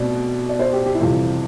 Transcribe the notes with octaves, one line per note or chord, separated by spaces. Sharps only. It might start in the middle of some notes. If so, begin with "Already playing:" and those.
Already playing: B2 A3 C4 D5
D5
C5
G4
G4
E4
F2 C3 E3 G3 F4